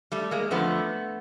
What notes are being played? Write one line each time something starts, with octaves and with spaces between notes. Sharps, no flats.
G3 A3
G#3 A#3
F2 D3 F3 A3 B3